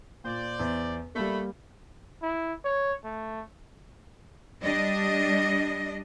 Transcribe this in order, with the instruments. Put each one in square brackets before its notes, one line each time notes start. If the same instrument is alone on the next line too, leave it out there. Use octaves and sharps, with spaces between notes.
[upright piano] A#2 [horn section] C5 D5
[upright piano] E2
[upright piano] G3 A#3 [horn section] A3 B5
[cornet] E4
C#5
A3
[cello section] G3 D4 D#5